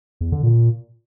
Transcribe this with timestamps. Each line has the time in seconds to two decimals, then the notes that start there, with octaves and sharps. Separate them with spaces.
0.21 E2
0.32 D3
0.43 A#2